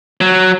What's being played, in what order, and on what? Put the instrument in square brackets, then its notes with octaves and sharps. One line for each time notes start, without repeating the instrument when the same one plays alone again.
[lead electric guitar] F#3